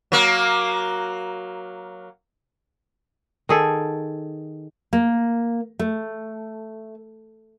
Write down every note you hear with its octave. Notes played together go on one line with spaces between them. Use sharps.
F#3 A#3
D#3 G#4 A4
A#3
A3